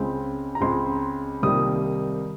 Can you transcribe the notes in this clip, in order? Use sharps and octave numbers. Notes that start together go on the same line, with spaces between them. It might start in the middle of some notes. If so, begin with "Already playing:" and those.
Already playing: C#2 C#3 G#3 C4
A#5
C#2 C#3 G#3 C4 C6
C2 C3 D#3 G3 A#3 D#6